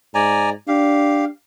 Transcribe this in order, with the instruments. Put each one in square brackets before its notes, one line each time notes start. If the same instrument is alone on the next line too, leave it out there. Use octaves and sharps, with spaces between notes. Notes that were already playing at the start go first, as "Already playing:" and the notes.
[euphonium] G#2 [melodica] D5 G#5 A#5
[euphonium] D4 [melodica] G4 F5